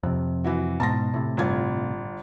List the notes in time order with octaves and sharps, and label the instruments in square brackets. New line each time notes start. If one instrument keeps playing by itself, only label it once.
[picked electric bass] F2 C3
[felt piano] E3 E4 F#4
[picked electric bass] G#2 B2 [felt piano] A5 C6 A#6
[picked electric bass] A2 C3
[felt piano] G1 F4 G#6